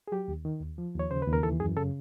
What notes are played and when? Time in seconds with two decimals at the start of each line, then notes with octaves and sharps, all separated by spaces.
0.08 G#4
0.12 F#3 G4
0.28 D#2
0.45 D#3
0.61 D#2
0.78 F3
0.94 D#2
0.99 C#5
1.11 C#3 C5
1.22 B4
1.27 D#2
1.33 A#4
1.43 E3 A4
1.60 F#2 G#4
1.77 C#3 A4